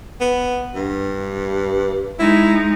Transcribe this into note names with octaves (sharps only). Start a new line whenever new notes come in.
B3
G2
G#3 D#4 E4